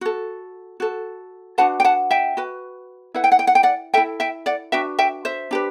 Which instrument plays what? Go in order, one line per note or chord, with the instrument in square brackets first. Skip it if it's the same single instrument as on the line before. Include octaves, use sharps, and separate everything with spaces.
[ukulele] F#4 A4
F#4 A4
D4 F#4 B4 F#5 A5
G5
F#5 A5
E5 G5
F#4 B4
E4 B4 F#5
G5
F#5
G5
F#5
G5
D5 F#5
E4 A4 E5 G5
E5 G5
D5 F#5
D4 F#4 B4 E5 G5
E5 G5
C5 E5
D4 G4 B4